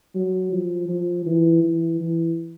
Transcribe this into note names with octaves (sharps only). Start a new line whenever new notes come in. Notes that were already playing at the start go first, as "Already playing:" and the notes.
F#3
F3
F3
E3
E3
E3